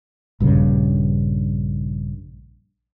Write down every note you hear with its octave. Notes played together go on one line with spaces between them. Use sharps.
A#1 G2 C#3